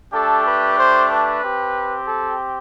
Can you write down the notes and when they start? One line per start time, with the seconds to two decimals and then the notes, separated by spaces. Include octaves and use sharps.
0.14 A3 D4 G4 A4
0.46 B4
0.78 C5
1.11 B4
1.43 C4 G4
2.07 A4